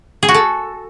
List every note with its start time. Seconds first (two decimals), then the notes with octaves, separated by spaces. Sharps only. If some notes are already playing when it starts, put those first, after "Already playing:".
0.23 G#4
0.29 F#4
0.34 A4